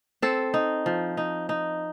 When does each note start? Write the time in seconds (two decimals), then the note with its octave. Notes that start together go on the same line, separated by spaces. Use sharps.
0.22 C4 A4
0.54 D#4
0.86 F3
1.17 D#4
1.49 D#4